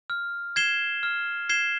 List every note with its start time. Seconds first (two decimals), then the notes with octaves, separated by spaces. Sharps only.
0.10 F6
0.56 G#6 C7 E7 G7
1.03 F6
1.49 G#6 C7 E7 G7